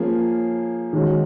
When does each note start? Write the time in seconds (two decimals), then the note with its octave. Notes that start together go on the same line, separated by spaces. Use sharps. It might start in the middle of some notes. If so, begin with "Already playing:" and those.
Already playing: F3 A#3 C#4 G#4
0.93 D#3 G#3 C#4 F#4